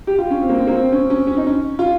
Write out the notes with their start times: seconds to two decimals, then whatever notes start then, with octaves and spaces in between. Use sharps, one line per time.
0.07 G4
0.18 F4
0.30 C#4
0.41 C4
0.49 A#3
0.58 C4
0.67 A#3
0.76 C4
0.92 C#4
1.10 C#4
1.27 C#4
1.37 D#4
1.47 C#4
1.79 F4